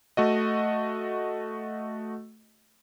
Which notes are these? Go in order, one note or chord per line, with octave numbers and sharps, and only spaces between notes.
A3 F#4 D#5